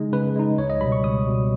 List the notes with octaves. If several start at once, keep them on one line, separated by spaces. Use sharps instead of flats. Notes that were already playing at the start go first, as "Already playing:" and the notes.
Already playing: C#3 G#3 D#4 D#5
C#3 B4
G#3 D#4
C#2 C#5
D#5
B2 G3 B5
C#6
C#2 D#6
B2 G3